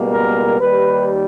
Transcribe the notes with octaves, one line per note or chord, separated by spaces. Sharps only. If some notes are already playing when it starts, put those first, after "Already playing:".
Already playing: C#2 B2 G3 A#3
A#4
D#2 D#3 G3 B4